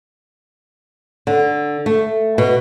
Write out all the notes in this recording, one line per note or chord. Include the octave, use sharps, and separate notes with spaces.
D3
A3
B2